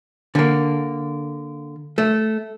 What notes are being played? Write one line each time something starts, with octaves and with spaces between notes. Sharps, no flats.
D3 A#3
A3